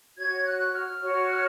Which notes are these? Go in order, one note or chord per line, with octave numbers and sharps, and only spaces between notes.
F#4 C#5 G#6
F#6
F6
F#4 C#5